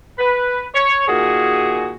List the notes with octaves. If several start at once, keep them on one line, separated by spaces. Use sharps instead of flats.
B4
C#5
A#2 D#3 F#4 G#4